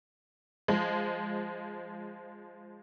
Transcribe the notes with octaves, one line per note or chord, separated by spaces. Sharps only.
F3 G#3